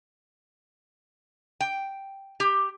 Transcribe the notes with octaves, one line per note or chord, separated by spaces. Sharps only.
G5
G4